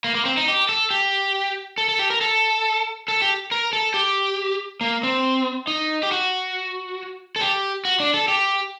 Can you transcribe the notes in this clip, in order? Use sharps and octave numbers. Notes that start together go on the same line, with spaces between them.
A#3
A#3
C4
D#4
G4
A4
G4
A4
A4
G4
A#4
A4
A4
G4
A#4
A4
G4
A#3
C4
D#4
G4
F#4
A4
G4
F#4
D4
A4
G4